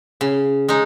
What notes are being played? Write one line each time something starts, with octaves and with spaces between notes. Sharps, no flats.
C#3
G#3 D#4